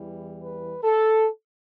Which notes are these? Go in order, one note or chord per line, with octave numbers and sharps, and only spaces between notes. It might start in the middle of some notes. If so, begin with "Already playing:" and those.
Already playing: E2 E3 G3
B4
A4